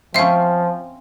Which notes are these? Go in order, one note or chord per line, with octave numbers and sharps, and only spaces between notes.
F3 C4 C#4 E5 F5